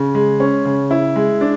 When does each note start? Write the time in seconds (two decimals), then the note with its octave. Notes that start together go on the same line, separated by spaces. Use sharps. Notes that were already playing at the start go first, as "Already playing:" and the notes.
Already playing: C#3
0.15 G#3
0.40 C#4
0.65 C#3
0.91 E4
1.16 G#3
1.41 D4